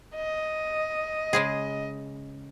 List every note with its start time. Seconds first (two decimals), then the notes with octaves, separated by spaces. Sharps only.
0.15 D#5
1.33 C#3 G#3 G#4